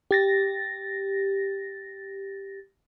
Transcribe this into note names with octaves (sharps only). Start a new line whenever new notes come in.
G4 A6 A#6